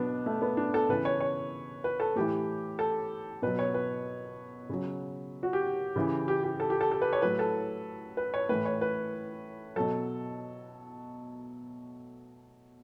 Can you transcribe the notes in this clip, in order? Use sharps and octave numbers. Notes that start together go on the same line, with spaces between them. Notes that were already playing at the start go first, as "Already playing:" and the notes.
Already playing: B2 F#3 B3 D4
A3
B3
D4
A4
C#3 E3 B4
C#5
C#5
B4
A4
A2 E3 G4
A4
B2 F#3 B4
C#5
B4
C#3 F#3
F#4
G4
C#3 E3
G4
G4
A4
G4
A4
A4
B4
C#5
A2 F#3 B4
A4
B4
C#5
A2 E3 B4
C#5
B4
B2 F#3 A4